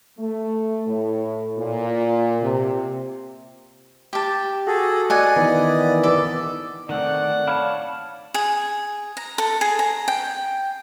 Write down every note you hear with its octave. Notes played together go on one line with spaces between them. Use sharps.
A3
A2
A#2
C3
G4 A5
F#4 G#4 A4
D5 D#5 F#5 G#5
D#3 E3 B3
A4 D5
D#3 A3 C4 D5 F#5
D4 C#5 F5 A5 B5 F6
G#4
A#5
A4
G#4
A#5
G5